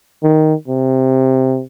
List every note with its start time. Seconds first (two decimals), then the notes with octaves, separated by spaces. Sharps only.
0.23 D#3
0.68 C3